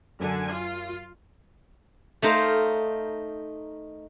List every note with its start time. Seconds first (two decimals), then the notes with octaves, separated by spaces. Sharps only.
0.20 F#2 D3 G#5
0.49 F4
2.22 A3 D#4 A#4 C5 F5